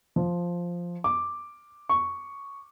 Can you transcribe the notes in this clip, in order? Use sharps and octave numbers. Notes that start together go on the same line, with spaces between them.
F3
D6
C#6